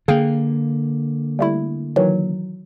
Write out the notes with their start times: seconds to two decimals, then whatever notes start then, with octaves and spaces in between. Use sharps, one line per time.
0.08 D3 A#3 G#4 F5 G5
1.39 G3 A3 E4
1.96 D#3 E3 F#3